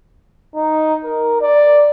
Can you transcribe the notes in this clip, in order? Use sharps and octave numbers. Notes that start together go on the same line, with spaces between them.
D#4
A#4
D5